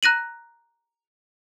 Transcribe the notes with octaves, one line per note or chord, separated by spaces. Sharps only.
A#5 F#6 A#6 D#7 F#7